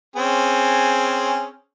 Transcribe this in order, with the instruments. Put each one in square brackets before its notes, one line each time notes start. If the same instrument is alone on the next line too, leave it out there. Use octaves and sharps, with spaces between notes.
[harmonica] C4 C#4 G#4